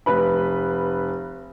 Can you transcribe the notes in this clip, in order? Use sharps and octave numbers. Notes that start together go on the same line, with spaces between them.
F1 B4 B5